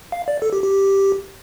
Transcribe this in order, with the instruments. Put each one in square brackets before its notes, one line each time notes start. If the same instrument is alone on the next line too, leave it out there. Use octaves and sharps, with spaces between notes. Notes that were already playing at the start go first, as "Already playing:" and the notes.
[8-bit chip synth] F5
D5
A4
G4
G4